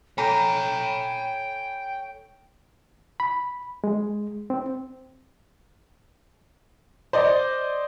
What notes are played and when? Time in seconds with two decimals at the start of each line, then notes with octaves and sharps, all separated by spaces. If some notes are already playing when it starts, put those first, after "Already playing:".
0.18 A4 C#5 G5 G#5 A#5 B5
3.20 B5
3.84 G#3
4.50 C4
7.13 C5 D5 D#5